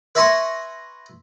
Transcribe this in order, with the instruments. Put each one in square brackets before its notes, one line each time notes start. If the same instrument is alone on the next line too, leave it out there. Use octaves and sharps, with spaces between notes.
[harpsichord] B4 E5 G#5 A#5 C6 C#6